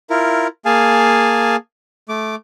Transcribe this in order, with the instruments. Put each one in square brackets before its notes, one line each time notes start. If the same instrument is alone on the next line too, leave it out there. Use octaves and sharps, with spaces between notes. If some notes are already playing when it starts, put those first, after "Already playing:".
[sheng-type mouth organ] E4 F4 A#4
A#3 G#4 F5 G#5 A5
A3 D6